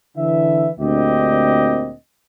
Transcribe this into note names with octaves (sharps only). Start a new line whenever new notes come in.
D3 E3 E5
D2 A#2 C4 D4 G4 D#5